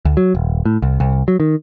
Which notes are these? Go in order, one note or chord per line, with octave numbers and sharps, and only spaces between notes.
D2
F#3
D#1
A2
C2
C2
F#3
D#3